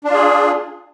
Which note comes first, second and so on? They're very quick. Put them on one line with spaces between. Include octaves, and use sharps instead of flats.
D4 F4 G#4